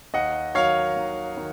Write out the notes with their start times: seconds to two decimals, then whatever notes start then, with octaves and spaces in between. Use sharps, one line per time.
0.14 D#2 D#5 F#5
0.55 D#3 F#3 C#5 F5
0.97 D#2
1.37 D#3